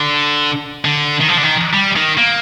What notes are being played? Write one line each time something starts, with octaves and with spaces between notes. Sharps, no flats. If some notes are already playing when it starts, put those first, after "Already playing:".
Already playing: D3
D3
D#3
F3
D3
D#3
G3
D#3
A#3